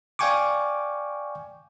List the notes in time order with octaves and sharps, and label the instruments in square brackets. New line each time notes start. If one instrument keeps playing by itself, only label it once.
[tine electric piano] D5 F5 G5 G#5 C#6 D6